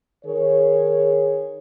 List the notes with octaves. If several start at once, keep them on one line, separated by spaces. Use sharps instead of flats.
D#3 G#4 A#4 C#5